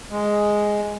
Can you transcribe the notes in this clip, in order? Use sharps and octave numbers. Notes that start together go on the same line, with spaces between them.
G#3